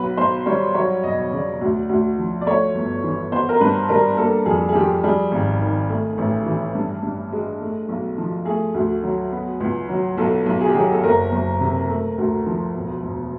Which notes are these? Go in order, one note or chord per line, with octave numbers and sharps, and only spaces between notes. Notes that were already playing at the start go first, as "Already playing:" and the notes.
Already playing: B1 F#3 B4
B1 C5
G3 C#5
F#3 C#5
E1 D#5
C#3 D5
D2
D2
F3
D5
A3 C#5
G1
E3
B3 C5
A#4
G2 B4
G3 A#4
A#3 A4
F2 G#4
G#4
F3 G4
G3 G#4
G#1
D#3
A3
A1
E3
G2
G2
G#3
A3
B1
F3
A3 G#4
D2
F#3
B3
C#2
F#3
B1 A4
B1
G#4
G4
F#3 G#4
A4
F#1 A#4
F#1
C3
A3
D2
F3
E1
E1